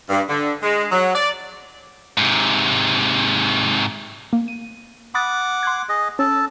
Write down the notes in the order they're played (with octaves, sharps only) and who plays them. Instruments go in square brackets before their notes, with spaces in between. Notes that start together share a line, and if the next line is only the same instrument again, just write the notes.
[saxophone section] G2
D3
G#3
F#3
D5
[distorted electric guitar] G#2 C3
[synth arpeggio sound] A#3
D#7
[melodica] F#5 D6 [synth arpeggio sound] B5 D#6 A6
[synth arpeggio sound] C6 F#6 G#6
[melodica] G#4 D#5
[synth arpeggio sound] C#4 [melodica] A4 A5